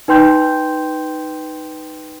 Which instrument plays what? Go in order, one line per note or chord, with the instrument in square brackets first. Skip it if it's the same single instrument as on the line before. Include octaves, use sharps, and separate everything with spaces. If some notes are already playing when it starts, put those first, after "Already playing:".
[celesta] D#4 B4 G5 C6 G6